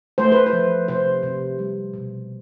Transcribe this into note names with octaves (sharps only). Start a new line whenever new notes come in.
A3 C5
B4
C5
F3
C3 C5
C3
G3
B2